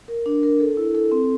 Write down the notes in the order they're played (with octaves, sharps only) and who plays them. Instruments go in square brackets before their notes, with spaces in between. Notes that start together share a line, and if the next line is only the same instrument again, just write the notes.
[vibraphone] A#4
D4
A#4
A4
E4
A4
C4